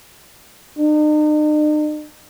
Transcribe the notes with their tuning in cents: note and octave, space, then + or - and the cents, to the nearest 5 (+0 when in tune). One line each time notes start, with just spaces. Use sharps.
D#4 -45